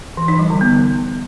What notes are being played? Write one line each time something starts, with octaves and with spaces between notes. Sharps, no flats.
E3
D#4
G3
D3
B3